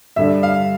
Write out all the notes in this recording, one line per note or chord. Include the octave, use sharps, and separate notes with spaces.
G2 D3 G3 E5
F5